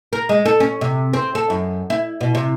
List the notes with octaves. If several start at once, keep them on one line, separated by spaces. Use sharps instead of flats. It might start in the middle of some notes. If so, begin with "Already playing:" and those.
A#4
G#3
A4
C#4
C3
C4
A4
F#2
E4
B2
C3